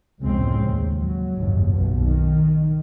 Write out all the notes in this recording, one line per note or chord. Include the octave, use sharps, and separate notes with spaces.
F1 C#2 A2 C#3 G#3 C4
D#2
F#3
F#1 D#2 G#2
B1 B2
D#3